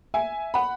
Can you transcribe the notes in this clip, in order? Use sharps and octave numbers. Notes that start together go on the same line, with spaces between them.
E5 G#5
F#5 B5